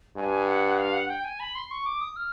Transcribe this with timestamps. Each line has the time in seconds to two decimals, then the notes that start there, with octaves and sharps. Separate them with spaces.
0.17 G2 G#5
0.47 F#5
0.78 F5
0.93 F#5
1.08 G5
1.24 G#5
1.40 B5
1.55 C6
1.71 C#6
1.86 D6
2.01 D#6
2.16 F6